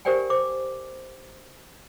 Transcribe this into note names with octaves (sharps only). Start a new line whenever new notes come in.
G4 A#4 C5 D5 G5 G#5
C5 D6